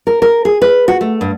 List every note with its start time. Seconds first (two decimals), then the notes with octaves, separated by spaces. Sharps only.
0.07 A#4
0.22 A#4
0.45 G#4
0.62 B4
0.88 F#4
1.01 A3
1.21 G2